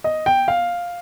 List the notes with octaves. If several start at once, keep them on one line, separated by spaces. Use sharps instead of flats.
D#5
G5
F5